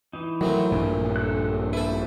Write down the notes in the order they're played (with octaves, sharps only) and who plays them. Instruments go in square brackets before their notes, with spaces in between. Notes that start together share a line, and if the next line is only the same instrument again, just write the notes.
[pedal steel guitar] E3 D#4
[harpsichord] D#3 A3 C4 [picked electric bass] F#3
[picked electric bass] A#1 G2 A#2
[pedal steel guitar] A4 F#6
[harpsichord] E4 A4 [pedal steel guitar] B4 C5